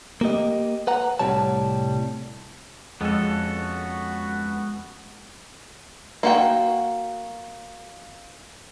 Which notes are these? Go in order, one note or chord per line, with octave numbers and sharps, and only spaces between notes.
A#3 G4 D#5
B4 F#5 A#5
C2 A2 C3 G3 C#5 A5
F2 G#3 B3 C#4 F#4 A4
A#3 F#4 G5